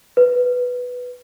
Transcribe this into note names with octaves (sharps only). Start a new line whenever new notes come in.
B4